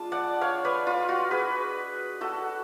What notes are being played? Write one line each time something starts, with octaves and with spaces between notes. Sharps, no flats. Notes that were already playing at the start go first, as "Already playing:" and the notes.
Already playing: G#3 D4 F4 A5
D5 F#5
C#5 F5
B4 D5
F4
F#4
G#4 B4
F#4 A4